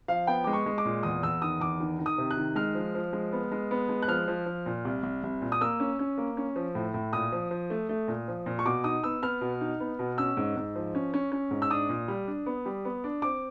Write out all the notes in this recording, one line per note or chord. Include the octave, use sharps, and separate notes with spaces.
F3 F5
B3 G5
G#3 D6
C#6
G#3
D6
A#2
E2 D#6
E2 E6
D#3 D#6
E2 D6
D#3
D#3
D#6
C3
F#6
D#3
G#3 F6
F3
F3
G#3
B3
G#3
B3
G#3
F#6
F3 F6
F3
F3
A#2
C2
C2
C2
A#2
D#6
A#3 E6
C#4
C#4
A#3
C#4
F3
A2
A2
A#2 D#6
F3
F3
A3
A3
A#2
F3
A#2
C#6
B2 D6
D#4 D#6
B3 E6
B3 F6
B2
D#4
B3
B2
C#4 E6
G#2
G#2
F3
C#4
C#4
C#4
G#2
E6
D4 D#6
A#2
G3
D4
B3
G3
B3
D4
C4 D6